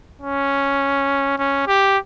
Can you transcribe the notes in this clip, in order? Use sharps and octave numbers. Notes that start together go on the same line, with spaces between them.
C#4
C#4
G4